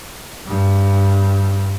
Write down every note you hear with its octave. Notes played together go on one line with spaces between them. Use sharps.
G2